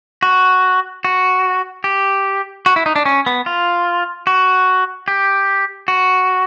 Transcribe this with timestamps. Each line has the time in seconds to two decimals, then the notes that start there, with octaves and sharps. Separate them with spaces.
0.23 F#4
1.04 F#4
1.84 G4
2.66 F#4
2.76 E4
2.86 D#4
2.96 D4
3.06 C#4
3.26 B3
3.46 F4
4.27 F#4
5.08 G4
5.88 F#4